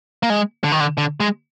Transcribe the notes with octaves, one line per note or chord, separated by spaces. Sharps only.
A#3
G#3
D3
D#3
D3
D3
G#3